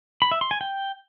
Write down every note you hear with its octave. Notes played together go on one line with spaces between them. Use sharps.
B5
E5
C6
G#5
G5